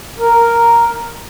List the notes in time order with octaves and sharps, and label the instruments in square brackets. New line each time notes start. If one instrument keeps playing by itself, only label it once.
[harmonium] A#4